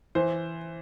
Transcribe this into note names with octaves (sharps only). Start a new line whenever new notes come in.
E3 C5